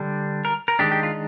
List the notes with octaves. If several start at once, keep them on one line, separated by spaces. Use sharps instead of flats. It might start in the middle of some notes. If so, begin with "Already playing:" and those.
Already playing: D3 G3 D4
A#4
A#4
D#3 G#3 D4 G4
G4
F4